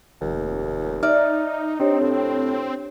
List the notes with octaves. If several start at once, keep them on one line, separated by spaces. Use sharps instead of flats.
F1 D#2
D#4 D5 E5 F6
C4 D4 D#4 G4 C#5
A2